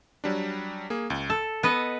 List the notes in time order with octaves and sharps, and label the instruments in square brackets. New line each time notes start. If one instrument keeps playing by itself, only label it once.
[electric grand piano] F#3 G3 D4
A#3 G#4
C#2
[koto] A4 [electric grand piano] E6
[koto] B3 B4 D#5